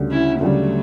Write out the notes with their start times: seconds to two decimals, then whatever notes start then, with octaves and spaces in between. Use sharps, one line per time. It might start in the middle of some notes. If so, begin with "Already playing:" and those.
Already playing: D2 C#3 G3
0.11 C#4 E4
0.40 D2 C#3 F#3 G3 A3